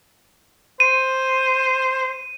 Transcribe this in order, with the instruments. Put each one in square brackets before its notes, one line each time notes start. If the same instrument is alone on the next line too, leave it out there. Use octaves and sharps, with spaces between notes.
[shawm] C5 [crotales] D#7